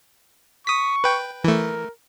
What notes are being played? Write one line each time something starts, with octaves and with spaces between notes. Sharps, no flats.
C#6 D#6 B6
B4 G5
E3 A3 A#4